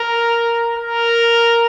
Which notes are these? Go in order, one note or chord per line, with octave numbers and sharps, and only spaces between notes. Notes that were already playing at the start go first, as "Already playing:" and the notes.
Already playing: A#4
A#4